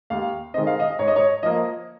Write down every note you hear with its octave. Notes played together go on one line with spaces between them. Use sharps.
D#2 F5
D#3 G#3 C4 D#5
F5
D#5
G#2 C#5
D#5
C#5
F3 A#3 D#5